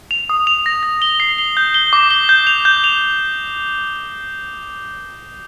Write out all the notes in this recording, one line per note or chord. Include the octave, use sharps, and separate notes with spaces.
F7
D#6
F7
A#6
A#6
G7
C7
G7
G6
G7
D6
G7
G6
F7
G6
F7